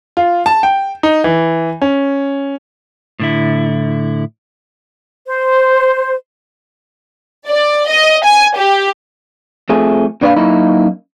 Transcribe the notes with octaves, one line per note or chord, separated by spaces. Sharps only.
F4
A5
G5
D#4
E3
C#4
A2 D3 E4
C5
D5
D#5
G#5
G4
F2 F3 A3 G#4
A#2 D4 B4 C5 F5 B5
F#2 A#3 D#4 E4 B5